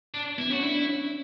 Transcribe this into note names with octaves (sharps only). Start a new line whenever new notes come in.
D4
B3 E4
C#4 F#4
D4 E4
D4
C#4